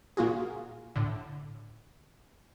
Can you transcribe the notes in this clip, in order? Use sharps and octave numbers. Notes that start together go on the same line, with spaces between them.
A#2 A#3 F4 F#4 G#4
A2 D3